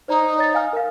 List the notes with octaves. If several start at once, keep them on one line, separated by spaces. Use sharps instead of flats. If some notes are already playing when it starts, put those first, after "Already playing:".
D#4 C5 D5 A#5
C#5 A6
F5 G#5 F6
A#4 F5